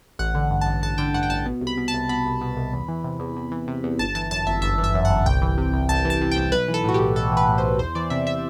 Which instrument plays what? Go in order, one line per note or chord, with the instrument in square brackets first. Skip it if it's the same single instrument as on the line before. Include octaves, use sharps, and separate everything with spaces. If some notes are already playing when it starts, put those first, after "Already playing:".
[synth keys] A1 F#5
D3
G2
A1 A5
A1 A5
D3 G5
G2 F#5
G5
A1 A5
B2
C2
B5
B2
A5
C2
B2 B5
C2
B2
C2
E2
E3
C3
E2
E2
E3
C3
E2
G1 A5
E3 A5
F#2 A5
G1 E5
G1 E5
E3
E5
F#2
G1 F#5
C2 G5
E3
C3
C2
C2 A5
E3
A5
C3
C2 G5
B1 B4
E3
A4
A2 F#4
G4
B1
B1 A4
E3
B4
A2
C5
B1
E2 C5
E3 D5
C3 E5
E5